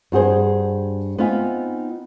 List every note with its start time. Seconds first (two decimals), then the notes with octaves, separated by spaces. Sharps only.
0.12 G2 F#4 G#4 C5
1.18 B3 C4 D#4 F4 E5 G#5